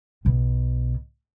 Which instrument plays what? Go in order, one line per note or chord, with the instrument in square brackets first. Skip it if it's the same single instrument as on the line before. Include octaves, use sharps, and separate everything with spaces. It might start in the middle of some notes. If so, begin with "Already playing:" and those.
[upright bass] B1 B2